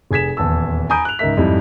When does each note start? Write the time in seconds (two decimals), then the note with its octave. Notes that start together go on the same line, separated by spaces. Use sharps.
0.11 F1 G#4 G#6 B6 E7
0.37 D#1 E2 A5 E6
0.90 G#5 A#5 B5 D#6 G6 D7
1.05 F#6 F7
1.19 C#2 G#2 D#4 A#4 E5 B6
1.37 F2 G#2 G3 D#4 E4